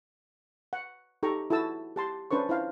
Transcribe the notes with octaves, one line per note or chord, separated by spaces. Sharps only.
F#5
D#4 G4 A4 G5 A#5 C#6
E4 F#4 A4 A5 E6
G4 A5 C6
C#4 D4 B4 C5 C#6
E4 C5 F5